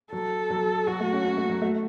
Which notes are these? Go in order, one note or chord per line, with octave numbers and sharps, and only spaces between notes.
F#3 A4
F#3
F#3 F#4
A3
C#4
C#4
A3
F#3
A3